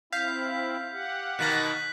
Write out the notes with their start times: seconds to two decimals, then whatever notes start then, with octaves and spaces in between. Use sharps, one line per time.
0.13 C4 E4 F5 G6 B6
0.91 G4 F#5
1.39 B2 D#3 A#3 F#6 B6 F#7